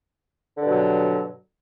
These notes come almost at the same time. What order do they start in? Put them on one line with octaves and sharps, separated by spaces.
D3 G2 B2 F#3